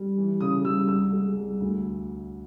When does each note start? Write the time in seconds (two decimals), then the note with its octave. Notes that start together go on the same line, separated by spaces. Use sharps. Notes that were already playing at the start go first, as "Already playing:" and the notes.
Already playing: G3
0.17 E3
0.40 C#3 D#6
0.65 G3 E6
0.88 C2 E6
1.13 G#3
1.36 C2
1.60 D2